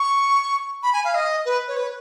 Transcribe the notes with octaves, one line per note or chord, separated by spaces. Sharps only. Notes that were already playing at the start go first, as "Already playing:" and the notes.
Already playing: C#6
B5
G#5
F5
D#5
B4
C#5
B4